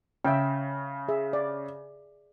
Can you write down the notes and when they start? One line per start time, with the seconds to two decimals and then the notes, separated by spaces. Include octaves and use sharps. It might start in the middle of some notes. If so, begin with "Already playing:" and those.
0.24 C#3 E5 G5
1.08 G#4 E5
1.33 D5